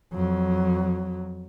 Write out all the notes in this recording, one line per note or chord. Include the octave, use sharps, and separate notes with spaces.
F2 F#3